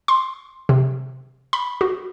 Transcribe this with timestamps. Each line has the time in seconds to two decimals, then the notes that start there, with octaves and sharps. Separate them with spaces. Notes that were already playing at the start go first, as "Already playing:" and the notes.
0.08 C6
0.69 C3
1.53 B5
1.81 F#4